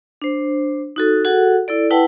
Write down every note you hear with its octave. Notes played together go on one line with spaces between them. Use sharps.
D4 C5
D#4 F#4 A4
F#4 G#4 A4 F#5
E4 A4 D5
E4 B4 F#5 G5 A5 E6